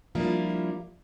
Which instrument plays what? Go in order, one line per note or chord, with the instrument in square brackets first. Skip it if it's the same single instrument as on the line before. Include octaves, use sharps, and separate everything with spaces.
[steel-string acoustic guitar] F3 G3 A#3 D4 E4 F4